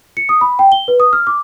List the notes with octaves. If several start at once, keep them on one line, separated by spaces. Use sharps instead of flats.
C#7
D#6
B5
G5
G7
B4
D#6
F6
D6